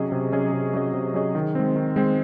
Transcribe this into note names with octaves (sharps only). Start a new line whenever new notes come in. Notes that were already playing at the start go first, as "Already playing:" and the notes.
Already playing: C3 F#3 C#4 G#4 D#5
C3
F#3 C#4 G#4 D#5
C3
F#3 C#4 G#4 D#5
C3
F#3 C#4 G#4 D#5
D#3
G#3 C4
D#3
G#3 C4